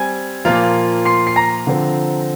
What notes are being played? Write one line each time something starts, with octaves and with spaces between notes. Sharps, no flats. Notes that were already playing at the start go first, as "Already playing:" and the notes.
Already playing: G3 C4 G#5 G#6
A#2 F3 A#3 F4
C6 C7
C7
A#5 A#6
D3 F3 C4